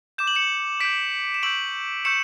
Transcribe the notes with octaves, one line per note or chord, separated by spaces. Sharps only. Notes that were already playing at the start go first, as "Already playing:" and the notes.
D6 G6 E7
F#7
C#7 E7
D6 G6 B6 D7
E7
C#6 E6 G6 D7 F#7
C#6 E6 G6 C#7 E7